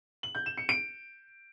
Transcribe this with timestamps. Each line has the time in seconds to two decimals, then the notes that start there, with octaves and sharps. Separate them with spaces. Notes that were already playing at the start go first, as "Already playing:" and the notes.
0.23 F#7
0.35 G6
0.46 E7
0.58 C#7
0.69 D7